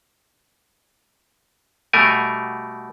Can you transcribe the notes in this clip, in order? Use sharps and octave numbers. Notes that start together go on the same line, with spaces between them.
B2 G3 A3 A#4 G#5